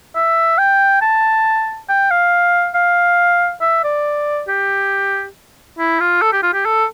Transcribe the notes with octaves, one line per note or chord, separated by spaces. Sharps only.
E5
G5
A5
G5
F5
F5
E5
D5
G4
E4
F4
A4
G4
F4
G4
A4